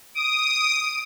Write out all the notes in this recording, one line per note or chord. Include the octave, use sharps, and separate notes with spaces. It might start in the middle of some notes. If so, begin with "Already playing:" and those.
D#6 D7